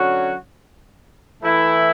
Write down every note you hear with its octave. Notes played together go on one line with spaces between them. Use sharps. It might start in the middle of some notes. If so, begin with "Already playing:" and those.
Already playing: D3 F#3 C#4 F#4 C#5
E3 A3 E4